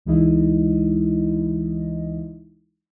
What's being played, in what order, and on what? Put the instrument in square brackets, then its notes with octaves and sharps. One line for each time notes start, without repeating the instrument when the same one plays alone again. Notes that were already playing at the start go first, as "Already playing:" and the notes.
[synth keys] C#2 E3 G#3 D#4 E4 D#5